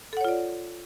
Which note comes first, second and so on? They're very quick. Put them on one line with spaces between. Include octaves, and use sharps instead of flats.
A4 F#5 C#5 F4 D5